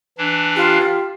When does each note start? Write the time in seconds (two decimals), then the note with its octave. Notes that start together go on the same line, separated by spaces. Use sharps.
0.18 E3 D4
0.56 F4 G4